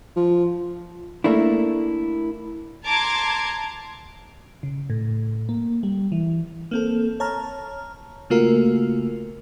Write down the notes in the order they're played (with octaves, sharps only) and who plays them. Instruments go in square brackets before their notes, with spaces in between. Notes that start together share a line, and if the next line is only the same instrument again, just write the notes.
[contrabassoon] F3
[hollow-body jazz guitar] A3 A#3 D4 E4
[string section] A5 A#5 C6 D6 G#6
[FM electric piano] C#3
A2
A#3
G3
E3
A#3 C4 A4
C#5 A5 A#5 F6
C#3 A3 A#3 F4 F#4 A#4